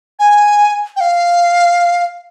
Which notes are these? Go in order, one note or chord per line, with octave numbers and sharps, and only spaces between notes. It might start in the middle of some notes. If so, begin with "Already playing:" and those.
G#5
G5
F5